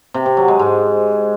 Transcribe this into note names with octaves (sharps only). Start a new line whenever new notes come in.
C3
C3
F#3
G#3
G#2